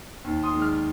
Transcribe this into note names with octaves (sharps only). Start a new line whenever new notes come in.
D#2
C6 D#6
D#3 G#3
D6 F6